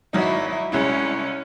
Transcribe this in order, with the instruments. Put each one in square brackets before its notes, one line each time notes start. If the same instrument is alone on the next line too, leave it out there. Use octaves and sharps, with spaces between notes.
[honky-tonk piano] G#1 F#3 D#4 [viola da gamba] E4
[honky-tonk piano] C2 G#3 E4 [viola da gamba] C#4